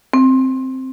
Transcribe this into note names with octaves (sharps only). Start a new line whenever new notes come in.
C4